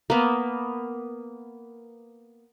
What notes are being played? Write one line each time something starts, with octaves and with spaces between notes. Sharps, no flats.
A#3 B3